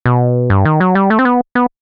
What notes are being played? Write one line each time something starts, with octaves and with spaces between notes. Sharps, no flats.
B2
G2
D#3
F#3
G3
A3
C4
B3
B3